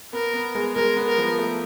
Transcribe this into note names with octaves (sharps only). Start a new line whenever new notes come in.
B3 A#4
B3
G#3
G#3 A#4
B3
A#4
F3
A3